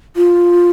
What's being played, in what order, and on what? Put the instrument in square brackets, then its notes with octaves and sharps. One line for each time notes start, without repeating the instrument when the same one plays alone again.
[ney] F4